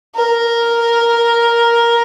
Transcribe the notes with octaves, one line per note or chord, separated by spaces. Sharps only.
A#4